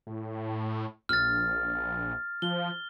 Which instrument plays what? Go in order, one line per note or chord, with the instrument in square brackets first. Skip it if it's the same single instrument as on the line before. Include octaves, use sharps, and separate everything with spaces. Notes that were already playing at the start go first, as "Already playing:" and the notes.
[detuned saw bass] A2
[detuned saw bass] A#1 [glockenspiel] F6 A6
[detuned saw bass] F3 [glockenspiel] G7